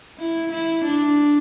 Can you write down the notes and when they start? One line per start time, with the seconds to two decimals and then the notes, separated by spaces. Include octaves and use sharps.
0.18 E4
0.51 E4
0.84 D4